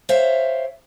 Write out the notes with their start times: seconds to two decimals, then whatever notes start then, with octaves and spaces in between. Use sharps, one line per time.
0.09 C5 C#5 E5 F5 G5